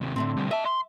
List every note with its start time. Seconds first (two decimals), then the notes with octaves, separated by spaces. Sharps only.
0.01 D#2 C3
0.16 A2 D3 A3 C4
0.37 B1 G3
0.51 D#5 E5 A5
0.66 C6